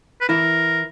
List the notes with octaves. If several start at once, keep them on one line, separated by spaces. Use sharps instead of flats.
B4
E3 E4 A#4